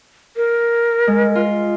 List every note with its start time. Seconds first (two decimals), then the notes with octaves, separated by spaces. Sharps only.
0.36 A#4
1.07 G#3
1.35 F4